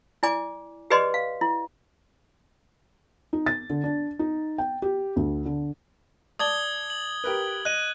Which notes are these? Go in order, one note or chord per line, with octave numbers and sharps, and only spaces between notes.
E4 D5 G#5 D6
G4 G#4 B4 D5 D#5 C6
F5
E4
D#4
A6
D3
D4
D#4
G5
G4
D2
D3
D5 A5 D#6 G#6 G7
F#7
G4 A#4 B4
D#5 F#6 D#7